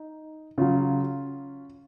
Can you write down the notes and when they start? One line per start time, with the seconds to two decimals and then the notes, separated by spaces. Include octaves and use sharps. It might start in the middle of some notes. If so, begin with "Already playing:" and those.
Already playing: D#4
0.58 C#3 F#3 C#4 F4